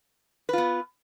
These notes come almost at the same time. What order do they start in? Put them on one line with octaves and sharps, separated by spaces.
B4 F4 B3